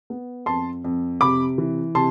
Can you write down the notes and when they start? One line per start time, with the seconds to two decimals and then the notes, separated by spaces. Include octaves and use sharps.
0.10 B3
0.46 F2 A5 C6
0.84 F2
1.21 C3 B5 D6
1.58 E3
1.95 C3 A5 C6